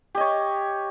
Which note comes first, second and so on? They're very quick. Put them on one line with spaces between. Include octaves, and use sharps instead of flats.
G4 D#5 C#5